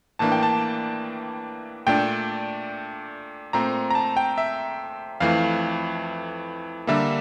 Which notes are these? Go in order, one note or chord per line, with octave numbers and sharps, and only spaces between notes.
A2 E3 A#3 D4 A5
G5
A5
A#2 A3 D4 G5
A#2 A3 C4 A#5
A#5
A5
G5
E5
F2 E3 A3 F5
D3 G3 A#3 E5